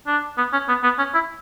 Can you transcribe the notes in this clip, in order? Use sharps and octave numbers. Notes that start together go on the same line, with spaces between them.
D4
B3
C#4
B3
B3
C#4
E4